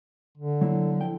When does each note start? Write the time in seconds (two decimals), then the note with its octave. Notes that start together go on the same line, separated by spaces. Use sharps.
0.38 D3
0.61 F#3 A#3 E4
1.01 F3 E4 G5